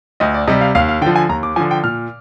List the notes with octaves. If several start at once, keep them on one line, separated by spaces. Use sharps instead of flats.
D2 D#5
D5
C3 G3 D#5
F5
D#2 F5
F5
D3 F3 G5
G#5
D#2 A#5
D6
D3 F3 G#5
G5
A#2 F6